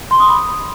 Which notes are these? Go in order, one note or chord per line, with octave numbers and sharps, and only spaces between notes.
C6
D#6
B5